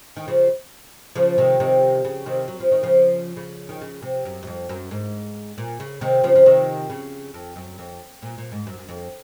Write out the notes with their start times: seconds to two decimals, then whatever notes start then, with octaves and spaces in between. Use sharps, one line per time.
0.17 D#3
0.28 C#3 F3
1.16 C#3 F3
1.38 C3 D#3
1.60 C3 D#3
2.05 C#3
2.26 C3 D#3
2.48 F#3
2.60 F3
2.71 D#3
2.83 C#3 F3
3.37 C#3
3.69 D#3
3.82 C#3
4.02 C3
4.25 F#2
4.43 F#2
4.47 F2
4.69 F#2
4.91 G#2
5.58 A#2
5.80 C#3
6.01 C3 D#3
6.24 C#3 F3
6.36 F3
6.46 C3 D#3
6.90 C#3
7.34 F2
7.56 F#2
7.79 F2
8.22 A#2
8.38 A#2
8.52 G#2
8.67 F#2
8.79 F#2
8.89 F2